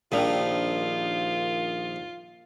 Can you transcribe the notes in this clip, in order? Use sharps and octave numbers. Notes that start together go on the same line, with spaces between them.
A#1 A#2 D#3 F3 G3 D4 F4